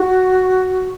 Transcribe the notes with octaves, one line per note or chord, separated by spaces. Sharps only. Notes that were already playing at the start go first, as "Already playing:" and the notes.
Already playing: F#4